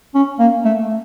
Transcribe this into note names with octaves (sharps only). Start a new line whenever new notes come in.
C#4
A#3
A3